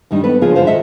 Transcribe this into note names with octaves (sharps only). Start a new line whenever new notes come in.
G2 D#3 G3 D4 D#4
B3 A4 B4
C#3 F3 F4 G#4
G2 D3 G3 C5 F5
D#3 A4 D#5 E5